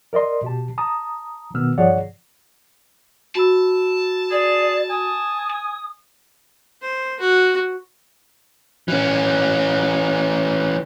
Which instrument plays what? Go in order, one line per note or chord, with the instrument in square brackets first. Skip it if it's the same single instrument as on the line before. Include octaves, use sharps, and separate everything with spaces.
[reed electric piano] A#4 D5 D#5 C6
B2 G4 A5
A5 A#5 D#6
B2 D#3 B3 E6 F6
G2 F3 G#4 C#5 D5 F#5
[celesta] F#4 B5 E6 [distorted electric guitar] A5
[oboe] G#4 [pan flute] D5
[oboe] G#5 [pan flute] D#6
[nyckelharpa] C5
F#4
[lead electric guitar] E3 C#4